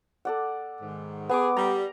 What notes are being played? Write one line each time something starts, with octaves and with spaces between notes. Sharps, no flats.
A4 D5 F#5
G#2 D#3
B3 G#4 D6
G3 A#5